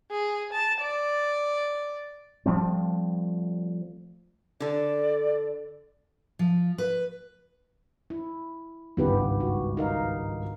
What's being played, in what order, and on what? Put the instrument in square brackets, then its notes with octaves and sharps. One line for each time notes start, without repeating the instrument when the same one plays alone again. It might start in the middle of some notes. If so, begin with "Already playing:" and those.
[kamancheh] G#4
A5
D5
[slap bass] F3 G3 A3 C4
[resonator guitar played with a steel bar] D3 A4 [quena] D5
[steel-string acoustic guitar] F3
B4
[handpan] E4
[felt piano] G#1 C#2 G2 [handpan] B3 G4 B4
[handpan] F#4
D#4 A#4 F5